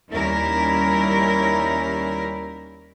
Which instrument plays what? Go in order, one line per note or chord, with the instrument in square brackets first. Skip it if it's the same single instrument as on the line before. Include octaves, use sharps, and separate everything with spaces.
[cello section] D#2 G3 C#4 E4 A#4